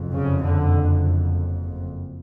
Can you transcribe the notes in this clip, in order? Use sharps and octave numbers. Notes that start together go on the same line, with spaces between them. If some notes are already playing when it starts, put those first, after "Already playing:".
Already playing: F#1 F2
C#3
D3